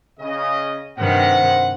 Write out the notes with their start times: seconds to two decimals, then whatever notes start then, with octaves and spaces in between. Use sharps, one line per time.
0.20 C#3 D#5
0.98 G2 C3 D#3 C5 F#5